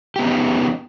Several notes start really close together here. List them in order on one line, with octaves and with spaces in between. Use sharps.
G4 B3 C#4 D#4